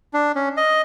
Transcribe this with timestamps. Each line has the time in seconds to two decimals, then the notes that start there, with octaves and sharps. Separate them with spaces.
0.14 D4
0.36 C#4
0.57 D#5